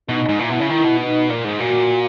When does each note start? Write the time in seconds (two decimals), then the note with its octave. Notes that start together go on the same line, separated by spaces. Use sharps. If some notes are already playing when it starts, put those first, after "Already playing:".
0.09 B2 D#4
0.29 G#2
0.39 A#2 E4
0.50 B2
0.60 C#3
0.69 D#3 E4
0.84 B2
1.00 D#4
1.30 A#2
1.45 G#2
1.60 A#2 F#4